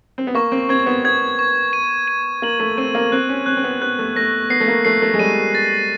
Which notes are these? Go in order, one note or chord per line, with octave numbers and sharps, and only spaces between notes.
C4
B3
A#3 C#6
C4
C4 G#6
B3
B3 G#6
C#6
D#7
D#7
A#3 F#7
A3
C4 D#7
A#3
C4 F#6
C#4
C4 F#6
C4
B3
B3 F#6
A3
A3 A#6
B3 C7
A3
A#3
A3 C7
A3
G#3
G3 D#7
A6